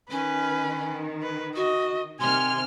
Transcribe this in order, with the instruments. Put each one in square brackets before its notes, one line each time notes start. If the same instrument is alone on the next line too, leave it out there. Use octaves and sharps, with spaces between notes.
[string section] D#3 [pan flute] C#4 [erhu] B4
[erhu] B4
[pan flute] F#4 [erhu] D#5
[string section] C3 D#3 F6 [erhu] G#5 [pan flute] C6